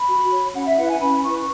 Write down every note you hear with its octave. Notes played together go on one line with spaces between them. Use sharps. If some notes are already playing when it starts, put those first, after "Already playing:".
Already playing: B5
F#4
C#5
C#4 F#5
E5
E4 B4 F#5
G#5
C#4 B5
E4 B4 C#6